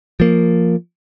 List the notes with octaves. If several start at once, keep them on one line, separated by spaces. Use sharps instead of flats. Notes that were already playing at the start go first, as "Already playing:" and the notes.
F3 A#3